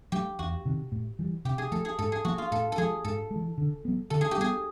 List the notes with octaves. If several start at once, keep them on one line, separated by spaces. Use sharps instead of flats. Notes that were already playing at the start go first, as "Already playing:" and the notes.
F#3 A3 G4
E2 F#4
C3 D#3
A2
E3 G3
C3 G4
G#4
F3 A3 A4
G#4
G#2 A4
G#4
F3 A#3 F#4
F4
A2 A4
A4
F3 G#3 G#4
G#2 A4
G#3
E3
D3
F#3 B3
D3 A4
G#4
G4
G3 B3 G#4